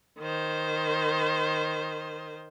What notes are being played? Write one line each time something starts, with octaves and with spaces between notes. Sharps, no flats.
D#3 C5